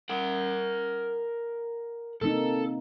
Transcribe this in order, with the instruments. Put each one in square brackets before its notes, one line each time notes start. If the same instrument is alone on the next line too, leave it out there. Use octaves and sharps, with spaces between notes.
[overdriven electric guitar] A#4 F#5
[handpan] C3 A#3 D#4 [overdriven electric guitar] A4